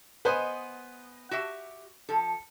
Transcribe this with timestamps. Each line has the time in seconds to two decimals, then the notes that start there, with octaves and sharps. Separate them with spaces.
0.25 B3 B4 C5 D#5 G#5
1.31 F#4 G4 E5
2.09 F3 A4